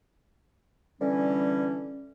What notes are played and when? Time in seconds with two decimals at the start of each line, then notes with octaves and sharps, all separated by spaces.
1.01 D3 E3 G3 C#4